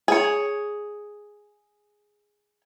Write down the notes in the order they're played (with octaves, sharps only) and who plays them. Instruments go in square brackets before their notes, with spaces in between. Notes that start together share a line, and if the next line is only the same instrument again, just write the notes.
[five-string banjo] G#4 C#5